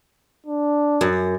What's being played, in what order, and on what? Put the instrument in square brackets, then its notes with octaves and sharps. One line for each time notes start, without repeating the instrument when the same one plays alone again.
[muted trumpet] D4
[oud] F#2